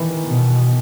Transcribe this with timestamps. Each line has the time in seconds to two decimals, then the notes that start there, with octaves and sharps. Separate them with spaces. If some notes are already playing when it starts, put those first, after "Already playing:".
Already playing: D#3 E3
0.26 B2